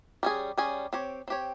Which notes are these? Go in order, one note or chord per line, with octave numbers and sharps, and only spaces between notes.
G3 C#4 G#4
G3 C#4 G#4
C4 G4 C#5
C4 G4 C#5